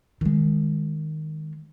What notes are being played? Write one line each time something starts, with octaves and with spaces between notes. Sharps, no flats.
D#3 G#3